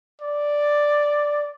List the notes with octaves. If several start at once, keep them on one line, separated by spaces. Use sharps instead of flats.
D5